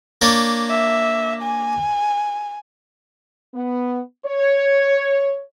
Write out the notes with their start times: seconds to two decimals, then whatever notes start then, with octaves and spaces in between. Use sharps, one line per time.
0.22 A#3 D4 C#5
0.70 E5
1.43 G#5
3.54 B3
4.26 C#5